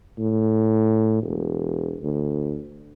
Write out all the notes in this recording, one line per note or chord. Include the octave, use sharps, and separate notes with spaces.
A2
E1
D2